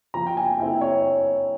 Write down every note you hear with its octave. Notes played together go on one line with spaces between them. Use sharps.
F3 A#5
G5
G#5
C4 E4 G5
C#5